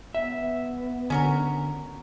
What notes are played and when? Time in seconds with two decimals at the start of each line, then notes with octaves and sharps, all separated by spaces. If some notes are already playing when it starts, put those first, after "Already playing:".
0.15 B3 E5
1.10 D3 C#4 F#4 A#4